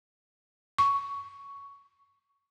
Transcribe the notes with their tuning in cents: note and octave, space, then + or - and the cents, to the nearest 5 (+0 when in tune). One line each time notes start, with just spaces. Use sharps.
C#6 +10